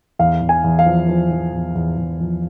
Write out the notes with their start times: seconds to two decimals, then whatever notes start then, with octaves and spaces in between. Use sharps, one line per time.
0.19 E2 F5
0.42 E2
0.49 G#5
0.64 E2
0.79 F5
0.86 F3
1.09 F3
1.31 F3
1.53 E2
1.75 E2
1.97 E2
2.20 F3